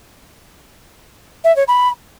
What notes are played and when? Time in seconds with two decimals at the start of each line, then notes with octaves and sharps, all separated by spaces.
1.44 E5
1.56 C#5
1.68 B5